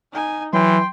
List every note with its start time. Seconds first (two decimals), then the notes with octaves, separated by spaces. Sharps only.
0.12 D#4 G#5
0.53 E3 F#3 G5 C6